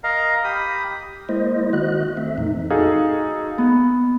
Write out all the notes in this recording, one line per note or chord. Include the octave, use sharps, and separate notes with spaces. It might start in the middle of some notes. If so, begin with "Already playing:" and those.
A#4 D#5 F5 A#5
G4 B5 D#6
G#3 A#3 E4 C5 D#5
D#3 F#4 D#5 F#6
A3 C4 E5
F2 A#2 E3 A3 D#4
D#4 F#4 G#4 A4 F5
B3